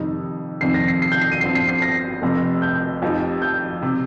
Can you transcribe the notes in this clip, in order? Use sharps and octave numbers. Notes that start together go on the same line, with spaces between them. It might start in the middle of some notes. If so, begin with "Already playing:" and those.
Already playing: F2 C3 D#3 G3 D#4
F2 C3 D#3 G3 C4 C7
A#6
C7
C7
G6
C7
D#7
G1 G2 F3 C4 C7
C7
C7
A#6
F1 F2 C3
G6
F2 F3 D#4 G4
G6
C3